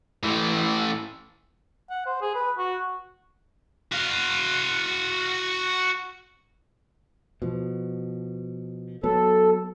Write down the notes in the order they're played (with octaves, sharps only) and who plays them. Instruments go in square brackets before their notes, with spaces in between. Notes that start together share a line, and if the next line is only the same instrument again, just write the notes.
[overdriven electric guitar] A2 E3
[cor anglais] F#5
C5
G#4
B4
F#4
[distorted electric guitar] F#4 F5
[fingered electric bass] B2 F3
[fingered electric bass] F#3 B3 [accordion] A4